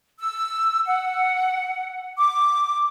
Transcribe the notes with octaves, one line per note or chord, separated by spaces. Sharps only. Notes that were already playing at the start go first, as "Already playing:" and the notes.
E6
F#5
D6